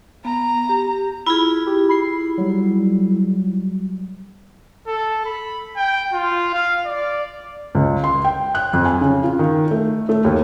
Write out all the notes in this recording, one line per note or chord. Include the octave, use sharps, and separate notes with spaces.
B3 A#5
G4
E4 F4 G#4 B5
G4
B5 C7
F#3 G3
A4
B5
G5
F4
F5
D5
C#2
C6
G5
F#6
F2
G#5
C#3
F4
D#3
A3
A3
D#2